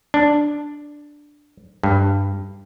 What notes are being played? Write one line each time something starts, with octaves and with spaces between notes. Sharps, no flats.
D4
G2